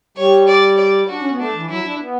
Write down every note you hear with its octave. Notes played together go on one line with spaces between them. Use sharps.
G3 C#5
D5
D5
D4 F#4
C#4
B3
A3 D4
E3
F#3 E4
D4
B3